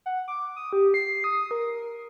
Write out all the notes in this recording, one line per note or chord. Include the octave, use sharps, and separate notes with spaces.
F#5
D6
D#6
G4
C7
D#6
A#4